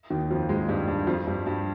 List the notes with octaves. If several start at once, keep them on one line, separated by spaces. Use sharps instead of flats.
D#2 D#3
F2 F3
G#2 G#3
G2 G3
G2 G3
F2 F3
G2 G3
G2 G3